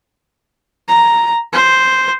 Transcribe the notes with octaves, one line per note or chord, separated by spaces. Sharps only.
A#5
C5